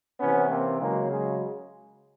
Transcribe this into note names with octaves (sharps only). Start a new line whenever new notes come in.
C3 E3 B3 C#4
A#3 C4
C#3 F#3 G#3 A#3
F#3 G#3